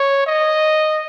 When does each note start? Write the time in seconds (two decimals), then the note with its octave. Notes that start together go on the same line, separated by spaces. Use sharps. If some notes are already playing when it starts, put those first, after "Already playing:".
Already playing: C#5
0.26 D#5